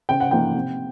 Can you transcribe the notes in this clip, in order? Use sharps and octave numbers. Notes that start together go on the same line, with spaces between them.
C#3 G5
F#5
F3 A#3 D#4 G5
C3